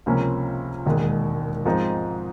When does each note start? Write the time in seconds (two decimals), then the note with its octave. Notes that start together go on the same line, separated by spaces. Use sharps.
0.06 C#2 C3 F3 A#3 C#4
0.86 E1 D#2 D#3 G#3
1.65 G#2 F3 G#3 C4 D#4